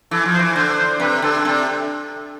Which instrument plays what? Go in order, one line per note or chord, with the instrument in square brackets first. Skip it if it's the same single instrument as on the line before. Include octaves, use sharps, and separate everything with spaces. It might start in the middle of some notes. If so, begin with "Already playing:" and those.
[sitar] E3 [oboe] A4
[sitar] F3
[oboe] C5
[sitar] E3
[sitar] D3 [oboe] C5
[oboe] C5
[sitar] C3 [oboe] B4
[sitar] D3 [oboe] A4
[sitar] C3 [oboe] A4